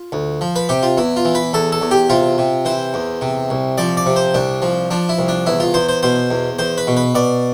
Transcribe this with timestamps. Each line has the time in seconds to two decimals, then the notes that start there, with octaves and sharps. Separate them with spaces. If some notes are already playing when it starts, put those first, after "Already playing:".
Already playing: F4
0.12 D2
0.41 F3
0.56 B4
0.69 C3 G4
0.83 F4
0.97 E2 E4
1.17 F4
1.25 E3
1.35 B4
1.53 E2 A4
1.72 A4
1.82 E2
1.91 G4
2.10 C3 F4
2.38 C3
2.65 E3 C5
2.94 E2
3.21 C3
3.50 C2
3.78 F3 D5
3.97 D5
4.06 C3
4.16 C5
4.34 C2 D4
4.62 F3
4.91 F3 D4
5.09 E4
5.19 C2
5.28 D4
5.46 E2 E4
5.60 F4
5.74 E2 C5
5.89 C5
6.03 B2 C5
6.31 E2
6.59 E2 C5
6.78 B4
6.87 B2
6.97 B4
7.15 B2 D5